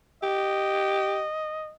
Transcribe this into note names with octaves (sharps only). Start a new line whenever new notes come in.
G4 D#5